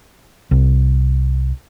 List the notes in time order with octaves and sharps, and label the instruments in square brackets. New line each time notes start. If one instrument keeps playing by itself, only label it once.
[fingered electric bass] C2